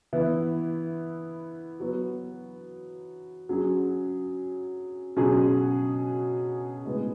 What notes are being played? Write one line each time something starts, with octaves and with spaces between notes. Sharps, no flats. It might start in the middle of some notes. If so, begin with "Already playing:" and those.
E3 B3 E4
F#3 B3 F#4
F#3 C#4 G#4
B2 F#3 C#4 G#4
A2 G#3 B3